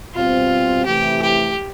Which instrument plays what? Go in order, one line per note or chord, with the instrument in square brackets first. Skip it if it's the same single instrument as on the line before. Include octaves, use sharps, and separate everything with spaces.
[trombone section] B2 G3 C4 [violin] F4
[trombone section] C3 E3 A3 E4 [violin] G4
[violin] G4